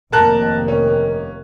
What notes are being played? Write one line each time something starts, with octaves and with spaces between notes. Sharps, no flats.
F1 D#3 A#3 A#4 A5 F#6
C#4